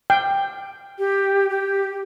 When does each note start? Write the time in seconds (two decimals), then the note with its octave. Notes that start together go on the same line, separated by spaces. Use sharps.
0.10 G5
0.99 G4
1.50 G4